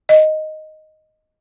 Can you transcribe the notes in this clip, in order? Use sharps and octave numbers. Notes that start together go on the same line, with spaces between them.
D#5